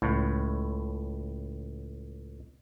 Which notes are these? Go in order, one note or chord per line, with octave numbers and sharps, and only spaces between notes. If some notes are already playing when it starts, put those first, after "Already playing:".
C#2 A2